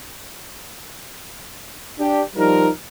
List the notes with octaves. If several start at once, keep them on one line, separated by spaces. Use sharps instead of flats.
D4 G4
F3 G3 D#4 A#4